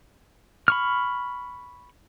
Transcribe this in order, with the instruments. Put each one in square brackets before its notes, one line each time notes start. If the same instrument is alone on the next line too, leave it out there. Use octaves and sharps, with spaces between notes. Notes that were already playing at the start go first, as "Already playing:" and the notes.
[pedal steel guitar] B5 C#6 F6